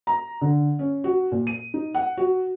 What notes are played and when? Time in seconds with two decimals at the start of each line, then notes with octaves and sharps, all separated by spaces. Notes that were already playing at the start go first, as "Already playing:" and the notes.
0.07 A#5
0.41 D3
0.79 C#4
1.04 F#4
1.32 A#2
1.47 D#7
1.74 D#4
1.94 F#5
2.17 F#4